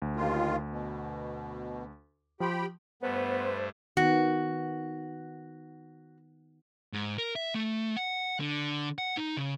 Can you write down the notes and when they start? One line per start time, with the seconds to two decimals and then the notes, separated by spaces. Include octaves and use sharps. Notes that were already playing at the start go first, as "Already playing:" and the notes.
0.02 D2
0.16 D#2 D#3 F4
0.70 B2
2.40 F3 G4 G5 B5 C6
3.02 G2 A3 B3 B4 C5
3.97 D#3 B3 F#4
6.93 G#2
7.18 A#4
7.36 E5
7.55 A3
7.97 F#5
8.40 D3
8.98 F#5
9.17 D#4
9.37 C#3